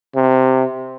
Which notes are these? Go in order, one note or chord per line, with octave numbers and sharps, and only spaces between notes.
C3